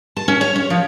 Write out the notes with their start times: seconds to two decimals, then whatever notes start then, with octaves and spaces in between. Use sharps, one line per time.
0.17 A5
0.28 C#4
0.41 C#5
0.56 C#4
0.70 F3